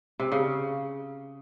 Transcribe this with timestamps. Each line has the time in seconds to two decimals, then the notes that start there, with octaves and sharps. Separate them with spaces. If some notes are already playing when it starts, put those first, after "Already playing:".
0.19 C3
0.32 C#3